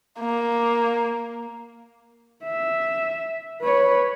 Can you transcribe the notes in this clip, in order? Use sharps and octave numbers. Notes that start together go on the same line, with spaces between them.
A#3
E5
B4 C#5